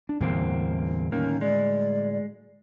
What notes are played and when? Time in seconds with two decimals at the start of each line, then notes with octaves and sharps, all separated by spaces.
0.09 D4
0.20 E2 A2 D3 G3 A#3 C4
1.12 D#3 A#3 C#4
1.41 G#3 D5